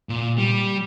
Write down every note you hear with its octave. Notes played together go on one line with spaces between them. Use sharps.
A#2
G3